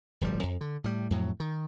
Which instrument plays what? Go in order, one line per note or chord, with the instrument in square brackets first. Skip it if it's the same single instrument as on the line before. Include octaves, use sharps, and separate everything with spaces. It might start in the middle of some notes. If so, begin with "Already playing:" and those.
[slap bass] D1 G1 F3 G3
F2
D3
A2 G3
F2 A2 F#3
D#3